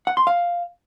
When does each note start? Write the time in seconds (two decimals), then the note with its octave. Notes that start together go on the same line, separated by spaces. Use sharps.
0.07 F#5
0.17 C6
0.27 F5